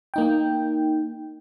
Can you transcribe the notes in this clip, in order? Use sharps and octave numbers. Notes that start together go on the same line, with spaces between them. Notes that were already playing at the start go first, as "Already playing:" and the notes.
A#3 D#4 G5